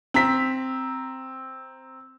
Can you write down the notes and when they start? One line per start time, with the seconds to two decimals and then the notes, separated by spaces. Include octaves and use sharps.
0.14 C4 A#5 B6